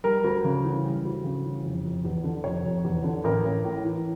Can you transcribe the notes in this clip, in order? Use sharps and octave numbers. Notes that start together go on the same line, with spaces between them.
G3 A#4
D2
C#3
E3
G3
D2
C#3
E3
F1
F1
E2
D3
F1 C#5
F1
E2
D3
A1 A#4
A1
A2
E3